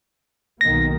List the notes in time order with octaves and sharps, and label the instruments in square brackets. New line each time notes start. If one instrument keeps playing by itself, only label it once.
[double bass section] B1 D#3 A#3 [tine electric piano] A#6